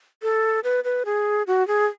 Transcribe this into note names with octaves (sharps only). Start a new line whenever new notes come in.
A4
B4
B4
G#4
F#4
G#4